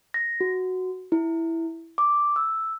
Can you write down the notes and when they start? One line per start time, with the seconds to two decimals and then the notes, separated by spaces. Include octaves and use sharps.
0.14 A#6
0.41 F#4
1.12 E4
1.98 D6
2.36 E6